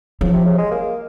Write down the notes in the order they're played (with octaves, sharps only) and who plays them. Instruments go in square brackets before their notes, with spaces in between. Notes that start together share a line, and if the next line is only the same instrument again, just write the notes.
[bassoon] C#3 [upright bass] F3
[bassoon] C3
C#3
G#3
A#3